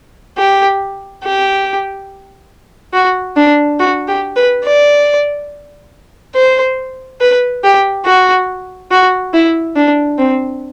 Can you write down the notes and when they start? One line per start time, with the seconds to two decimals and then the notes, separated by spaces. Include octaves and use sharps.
0.38 G4
1.24 G4
2.93 F#4
3.36 D4
3.80 F#4
4.08 G4
4.36 B4
4.65 D5
6.35 C5
7.21 B4
7.64 G4
8.05 F#4
8.91 F#4
9.34 E4
9.76 D4
10.18 C4